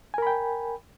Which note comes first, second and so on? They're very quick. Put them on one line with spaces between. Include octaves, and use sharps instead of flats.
G#5 A#4 B5 G5